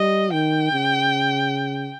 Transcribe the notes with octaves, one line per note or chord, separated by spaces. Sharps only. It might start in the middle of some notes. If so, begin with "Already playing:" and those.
Already playing: G3 D#5
D#3 G5
C#3